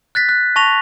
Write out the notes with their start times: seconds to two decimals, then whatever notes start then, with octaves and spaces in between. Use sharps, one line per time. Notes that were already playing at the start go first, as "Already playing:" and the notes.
0.15 F#6 A6 B6
0.29 F#6
0.56 A5 C#6 A#6 F7